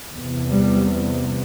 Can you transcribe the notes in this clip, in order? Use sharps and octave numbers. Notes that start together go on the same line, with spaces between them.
E2 C3
G3